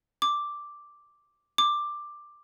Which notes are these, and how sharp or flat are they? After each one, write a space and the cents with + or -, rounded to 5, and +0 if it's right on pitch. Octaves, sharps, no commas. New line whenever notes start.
D6 +0
D6 +10